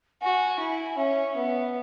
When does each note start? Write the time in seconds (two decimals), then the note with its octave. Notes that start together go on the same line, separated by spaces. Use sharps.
0.21 F#4 G#5
0.60 E4
0.97 C#4 E5
1.36 B3